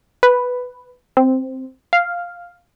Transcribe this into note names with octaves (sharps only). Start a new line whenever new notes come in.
B4
C4
F5